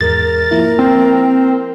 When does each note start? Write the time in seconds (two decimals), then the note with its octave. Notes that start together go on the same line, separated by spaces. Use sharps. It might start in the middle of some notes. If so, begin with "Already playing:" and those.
0.01 E2 G#2 G#3 A#4 A6
0.51 F3 A#3 E4
0.79 C4